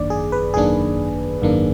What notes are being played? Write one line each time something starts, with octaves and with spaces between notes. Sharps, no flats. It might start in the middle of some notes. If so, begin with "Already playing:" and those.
Already playing: G#1 F#2 D#3 A#3 D4 D5
G#4
B4
G#1 F#2 D#3 A#3 D4 G#4
G#1 F#2 D#3 A#3 D4